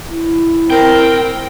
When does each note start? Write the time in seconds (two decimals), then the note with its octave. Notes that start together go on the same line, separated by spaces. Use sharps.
0.12 E4
0.70 C4 A#4 G5